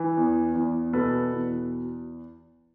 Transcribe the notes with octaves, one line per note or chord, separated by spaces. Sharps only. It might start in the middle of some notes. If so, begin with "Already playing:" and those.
Already playing: E3
E2
E2
B2 A4 B4
E2